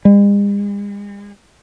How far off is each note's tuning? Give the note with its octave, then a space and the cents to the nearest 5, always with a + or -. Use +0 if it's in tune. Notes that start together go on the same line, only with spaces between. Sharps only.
G#3 -45